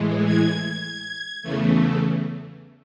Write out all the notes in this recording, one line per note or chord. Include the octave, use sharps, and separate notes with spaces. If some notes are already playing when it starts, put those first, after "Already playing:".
Already playing: A2 E3 G#3
G#6
E2 C#3 E3 A3